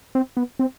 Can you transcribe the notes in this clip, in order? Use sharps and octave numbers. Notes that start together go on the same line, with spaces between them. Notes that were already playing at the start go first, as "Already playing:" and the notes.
C4
B3
C4